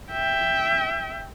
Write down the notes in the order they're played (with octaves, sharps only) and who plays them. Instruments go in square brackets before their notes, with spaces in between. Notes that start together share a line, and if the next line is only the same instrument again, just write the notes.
[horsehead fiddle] E5 G5